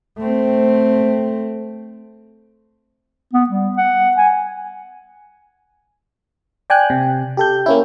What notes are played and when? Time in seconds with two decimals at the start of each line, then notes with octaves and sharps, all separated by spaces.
0.18 A3 C4
3.33 B3
3.49 G3
3.77 F#5
4.17 G#5
6.70 D5 G5 G#5 F#6
6.90 C3
7.37 G4 A4 G6
7.66 A#3 C#4 E4